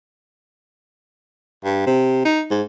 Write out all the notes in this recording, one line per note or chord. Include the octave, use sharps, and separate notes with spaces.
G2
C3
D#4
G#2